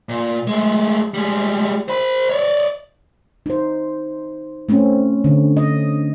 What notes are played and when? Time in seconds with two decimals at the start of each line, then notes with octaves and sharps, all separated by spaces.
0.09 A#2
0.47 G#3 A3
1.14 G3 G#3
1.88 C5 B5
2.30 C#5 D5
3.46 D#4 C5
4.69 A3 C4 C#4
5.24 D3
5.57 D#5